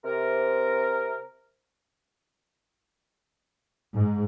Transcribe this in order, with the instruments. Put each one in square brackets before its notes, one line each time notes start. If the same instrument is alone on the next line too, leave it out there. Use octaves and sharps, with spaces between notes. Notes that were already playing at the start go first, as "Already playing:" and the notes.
[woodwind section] C3 A#4
[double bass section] G#2